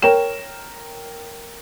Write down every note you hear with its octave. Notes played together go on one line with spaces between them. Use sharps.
A#4 C#5 G5 E7